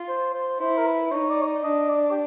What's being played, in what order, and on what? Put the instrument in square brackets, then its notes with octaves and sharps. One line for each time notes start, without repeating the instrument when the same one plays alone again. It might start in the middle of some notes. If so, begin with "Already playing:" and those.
Already playing: [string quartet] F4
[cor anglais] C5
C5
[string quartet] E4 [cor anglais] C5
[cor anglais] A#4
B4
[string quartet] D#4 [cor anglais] C#5
[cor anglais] D5
C#5
D5
[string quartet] D4 [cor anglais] D#5
[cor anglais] D5
G4